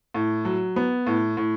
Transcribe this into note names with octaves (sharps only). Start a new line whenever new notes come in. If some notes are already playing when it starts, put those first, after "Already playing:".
A2
F#3
B3
A2
A2